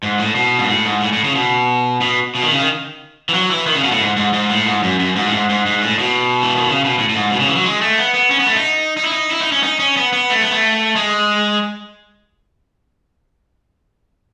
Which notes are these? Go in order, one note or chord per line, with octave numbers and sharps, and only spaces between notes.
G#2
A2
B2
G#2
A2
G#2
A2
A2
C#3
B2
B2
B2
D#3
C#3
D#3
E3
F#3
E3
D#3
C#3
B2
A2
G#2
G#2
G#2
A2
G#2
F#2
F#2
G#2
A2
G#2
G#2
G#2
A2
B2
E3
D#3
C#3
B2
A2
A2
G#2
B2
C#3
E3
F#3
G#3
A3
B3
B3
C#4
B3
A3
D#4
D#4
E4
D#4
E4
D#4
C#4
D#4
C#4
B3
B3
A3
B3
A3
G#3